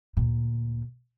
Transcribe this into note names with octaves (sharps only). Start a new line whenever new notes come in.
D2 A#2